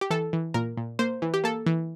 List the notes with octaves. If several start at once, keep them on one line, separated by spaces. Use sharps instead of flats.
G4
E3 A4
E3
A#2 A#4
A#2
A#3 C5
E3
G4
A#3 A4
E3